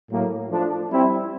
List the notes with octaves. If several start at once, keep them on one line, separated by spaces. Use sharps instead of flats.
A2 F#3 A#3
F3 A3 D4
G3 C4 E4